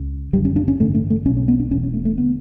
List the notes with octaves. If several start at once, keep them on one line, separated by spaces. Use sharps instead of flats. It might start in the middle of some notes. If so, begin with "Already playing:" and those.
Already playing: C#2 C#3
F#1 F#2 D3 G3
C#4
D4
C#4
A1 G2 D3 A3
A3
A3
B1 B2 C#4
C#4
B3
D4
E1 E2 B2 C#4
C#4
A3
A3
D3 B3